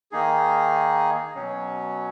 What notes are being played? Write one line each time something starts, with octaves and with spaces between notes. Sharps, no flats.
D#3 A#3 D#4 G#4
B2 F#3 C#4